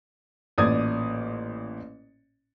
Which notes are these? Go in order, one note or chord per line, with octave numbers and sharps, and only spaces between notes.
A1 A#2 D5 D#6 G#6